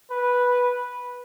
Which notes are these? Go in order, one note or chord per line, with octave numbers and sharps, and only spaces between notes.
B4